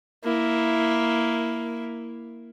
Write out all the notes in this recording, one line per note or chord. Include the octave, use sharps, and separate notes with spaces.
A#3 E4